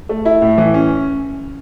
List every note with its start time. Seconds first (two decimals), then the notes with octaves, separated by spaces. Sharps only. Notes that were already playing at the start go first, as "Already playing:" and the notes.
0.09 A3
0.25 E4
0.42 A2
0.58 E3
0.74 C#4